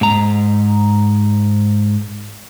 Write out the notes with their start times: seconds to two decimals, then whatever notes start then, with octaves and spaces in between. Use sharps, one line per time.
0.01 G#2 A#5